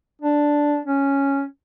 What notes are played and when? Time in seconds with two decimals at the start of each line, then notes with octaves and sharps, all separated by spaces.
0.22 D4
0.85 C#4